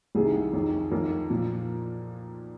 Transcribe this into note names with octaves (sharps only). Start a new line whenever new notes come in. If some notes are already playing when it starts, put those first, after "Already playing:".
C2 C3 D#3 G#4
F2 D#3
F2 D#3 A#4
A#2 F3